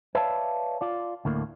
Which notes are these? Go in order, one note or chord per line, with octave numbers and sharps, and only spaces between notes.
B4 C#5 D5 E5 F5 A5
F4 D5
D2 A2 A#3